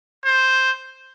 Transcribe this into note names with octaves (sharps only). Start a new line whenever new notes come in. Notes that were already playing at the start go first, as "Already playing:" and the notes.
C5